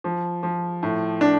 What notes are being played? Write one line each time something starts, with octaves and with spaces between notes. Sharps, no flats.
F3
F3
A2
D4